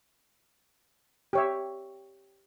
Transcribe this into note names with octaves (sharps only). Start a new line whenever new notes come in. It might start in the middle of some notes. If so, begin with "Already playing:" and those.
G4 C#5 E5